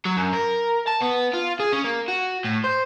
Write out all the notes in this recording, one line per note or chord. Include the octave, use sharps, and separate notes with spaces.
F#3
F#2
A#4
A5
B3
F4
G#4
C#4
A#3
F#4
A2
C5